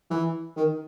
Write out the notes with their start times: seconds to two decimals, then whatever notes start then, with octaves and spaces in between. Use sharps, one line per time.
0.10 E3
0.57 D#3